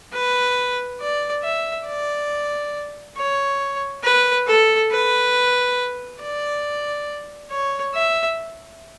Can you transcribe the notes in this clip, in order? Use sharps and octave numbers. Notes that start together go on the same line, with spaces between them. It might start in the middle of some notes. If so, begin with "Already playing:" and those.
B4
D5
E5
D5
C#5
B4
A4
B4
D5
C#5
E5